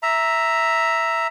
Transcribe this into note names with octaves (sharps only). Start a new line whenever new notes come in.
E5 A#5